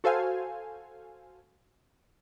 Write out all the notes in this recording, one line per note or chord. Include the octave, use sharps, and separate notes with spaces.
F#4 A4 C5 F5 G#5